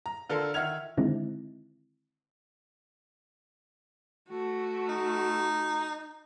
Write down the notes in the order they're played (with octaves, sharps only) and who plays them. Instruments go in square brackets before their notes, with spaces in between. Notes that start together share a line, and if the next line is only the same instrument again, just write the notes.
[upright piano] A#5
D3 F4 A4 A#4
D#3 E5 F#5 F6 G#6 F7
[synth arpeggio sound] D3 D#3 G#3 C4 D#4 E4
[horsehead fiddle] A3 F#4
[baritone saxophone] D#4